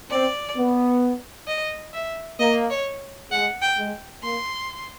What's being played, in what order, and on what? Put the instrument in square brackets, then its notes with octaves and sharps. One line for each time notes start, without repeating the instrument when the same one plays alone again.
[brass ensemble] C4 [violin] D5
[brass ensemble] B3
[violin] D#5
E5
[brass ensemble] A#3 [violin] D#5
[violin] C#5
[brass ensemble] G#3 [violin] F#5
[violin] G5
[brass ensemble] G#3
[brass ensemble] A#3 [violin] C6